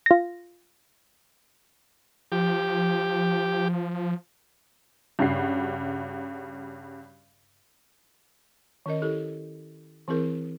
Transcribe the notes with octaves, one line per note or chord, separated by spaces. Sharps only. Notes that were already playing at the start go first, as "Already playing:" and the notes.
F4 A#6
F3 G4
G2 C#3 F#4 C7
D#3 C#4 A#4 D#5
E4 G4 A4
E3 C4 E4 G#4 A#4